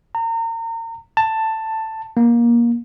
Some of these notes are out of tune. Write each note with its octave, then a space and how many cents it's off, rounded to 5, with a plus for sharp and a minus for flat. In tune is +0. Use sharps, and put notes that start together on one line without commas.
A#5 -35
A5 +10
A#3 +20